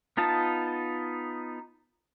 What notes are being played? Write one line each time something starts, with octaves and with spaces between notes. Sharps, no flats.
B3 D#4 F4 A5